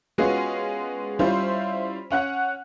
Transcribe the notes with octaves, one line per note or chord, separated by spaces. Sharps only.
G#3 B3 C#4 F4 F#4 G#4
G3 C#4 E4 F4 C5
C#4 F#5 F#6